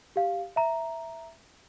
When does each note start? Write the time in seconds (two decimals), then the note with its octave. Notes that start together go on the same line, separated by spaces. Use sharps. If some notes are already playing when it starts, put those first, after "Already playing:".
0.16 G4 F5
0.56 E5 A#5